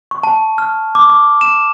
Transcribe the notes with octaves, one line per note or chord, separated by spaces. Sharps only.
C#6
A5
F6
D6
D6
E7